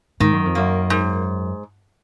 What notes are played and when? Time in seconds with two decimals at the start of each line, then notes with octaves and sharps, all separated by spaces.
0.20 G#2 D#3
0.33 F#2
0.45 F2
0.55 F#2 A#3
0.90 G#2